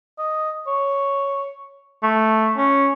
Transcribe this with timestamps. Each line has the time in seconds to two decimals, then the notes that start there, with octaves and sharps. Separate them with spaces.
0.18 D#5
0.67 C#5
2.03 A3
2.57 C#4